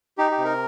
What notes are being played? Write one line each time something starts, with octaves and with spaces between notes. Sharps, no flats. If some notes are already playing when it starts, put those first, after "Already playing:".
D#4 G4
G4
C3
A#4